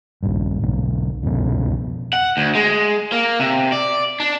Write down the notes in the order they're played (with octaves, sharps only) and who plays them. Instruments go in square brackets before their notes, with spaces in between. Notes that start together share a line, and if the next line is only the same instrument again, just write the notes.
[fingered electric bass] A#1 G2
E1 B1
C2 F2 B2
[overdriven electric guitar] F#5
D2
G#3
A#3
C3
D5
D4